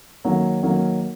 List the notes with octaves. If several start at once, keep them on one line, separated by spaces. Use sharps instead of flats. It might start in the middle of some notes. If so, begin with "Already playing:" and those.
D#3 F#3 A#3
D#3 F#3 A#3